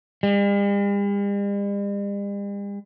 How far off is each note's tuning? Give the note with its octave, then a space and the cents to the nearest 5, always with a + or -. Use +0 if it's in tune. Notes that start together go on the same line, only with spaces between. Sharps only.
G3 +45